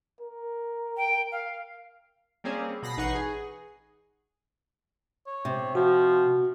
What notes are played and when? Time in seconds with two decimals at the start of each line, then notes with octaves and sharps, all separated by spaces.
0.21 A#4
0.97 G5
1.32 F5
2.44 G3 A#3 C4 C#4 G#4
2.82 B2 B5 A#6 C7
2.97 A1 D#4 B4 F#5 C#6 C7
3.15 G#4
5.27 C#5
5.45 C3
5.75 F3 F#4